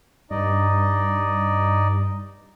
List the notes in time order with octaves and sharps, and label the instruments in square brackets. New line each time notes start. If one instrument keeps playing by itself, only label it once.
[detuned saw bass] G2 [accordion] D#4 D5 D#5